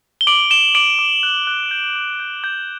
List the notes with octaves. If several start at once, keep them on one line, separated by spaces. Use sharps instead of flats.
G7
D6 D7 F#7
D6 E7 G7
D6 D7 F#7
D6
F#6
F#6
G6
D6
G6
D6 G6